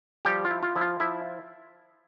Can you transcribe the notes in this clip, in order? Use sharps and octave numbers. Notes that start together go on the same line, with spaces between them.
F3 G3 G4
F4
E4
F4
F3 E4
F4
F3 E4 E5